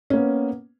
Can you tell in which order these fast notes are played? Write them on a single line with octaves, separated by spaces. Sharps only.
C#4 A#3 B3